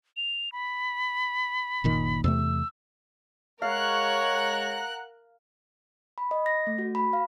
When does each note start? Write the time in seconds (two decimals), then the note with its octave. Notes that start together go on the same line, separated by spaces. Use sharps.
0.17 F7
0.52 B5
1.84 F#1 A#2 D#3
2.24 E2 C3 A3 E6
3.62 G#3 A#4 C#5 F5 F#5 A#5 F#6
6.18 B5
6.31 D#5
6.46 A#6
6.67 A3
6.78 F#4
6.95 B5
7.13 F5